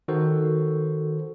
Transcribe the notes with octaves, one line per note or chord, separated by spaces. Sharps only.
D#3 F#4 A4 C5